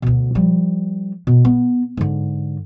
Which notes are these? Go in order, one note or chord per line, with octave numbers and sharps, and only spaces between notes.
D2 B2
F3 G3
B2
B3
G#2 D3